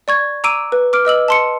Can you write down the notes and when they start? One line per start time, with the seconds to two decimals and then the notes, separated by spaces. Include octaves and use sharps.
0.08 D5 C#6 G#6
0.44 A#5 D6 E6 D7 D#7
0.72 B4
0.93 D6 F6 D7
1.05 B4 D#5 E6 F#7
1.28 A5 C6 C#7